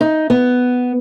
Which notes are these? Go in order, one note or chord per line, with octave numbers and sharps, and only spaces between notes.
D#4
B3